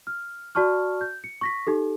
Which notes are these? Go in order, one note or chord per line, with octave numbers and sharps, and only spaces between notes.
F6
F#4 D5 A5 C#6 F6
G6
C#7
C#6 A#6 B6
D#4 G4 A4